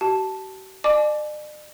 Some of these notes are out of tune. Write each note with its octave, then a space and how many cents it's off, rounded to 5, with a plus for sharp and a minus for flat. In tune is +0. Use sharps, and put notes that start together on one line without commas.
G4 -45 A5 +0
D5 +45 A5 -45 D6 +0